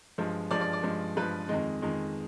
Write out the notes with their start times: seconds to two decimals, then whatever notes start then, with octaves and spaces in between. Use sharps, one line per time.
0.18 G2 F3 G#3
0.51 G2 F3 G#3 D5
0.61 D5
0.73 D5
0.83 G2 F3 G#3
1.16 G2 F3 G#3 B4
1.49 F2 D#3 G#3 D#5
1.82 F2 D#3 G#3